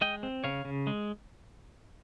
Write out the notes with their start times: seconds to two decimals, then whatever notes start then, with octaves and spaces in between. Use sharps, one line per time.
0.01 G#3 D#5 G5
0.23 C4
0.44 C#3 C#5 F5
0.65 C#3
0.87 G#3